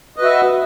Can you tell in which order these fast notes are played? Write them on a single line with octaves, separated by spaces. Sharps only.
D#5 B4 F#4 E5